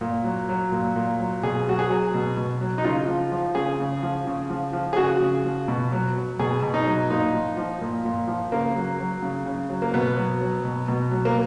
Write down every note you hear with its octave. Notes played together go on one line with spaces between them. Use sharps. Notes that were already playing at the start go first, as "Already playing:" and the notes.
A#2
F#3
F#3
A#2
A#2
F#3
B2 G#4
F#3 F#4
G#4
F#3
B2
B2
F#3
D#4
C#3 F4
F3
F3
C#3 G#4
C#3
F3
C#3
F3
F3
G#4
C#3 F#4
C#3
F3
B2
F#3
F#3
B2 G#4
B2
D#4
F#3
A#2 D#4
F3
F3
A#2
A#2
F3
C#3 A#3
F#3
F#3
C#3
C#3
F#3
A#3
B2 B3
F#3
F#3
B2
B2
F#3
A#3